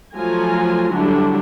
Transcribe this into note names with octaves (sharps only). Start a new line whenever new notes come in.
F3 F#3 A3 F4 G#5 A#5
D3 F#3 G3 D4 E4